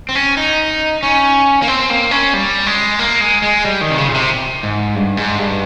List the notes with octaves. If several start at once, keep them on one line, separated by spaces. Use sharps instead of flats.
C4
C#4
D#4
C#4
A#3
C4
A#3
C#4
G3
G#3
A#3
G#3
G#3
G3
D#3
C3
C#3
A#2
C3
G#2
G2
G#2
G2